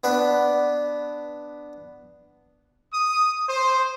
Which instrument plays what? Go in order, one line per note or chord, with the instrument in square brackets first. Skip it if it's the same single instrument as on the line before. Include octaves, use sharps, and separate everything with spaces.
[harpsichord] B3 D4 B4
[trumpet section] D#6
C5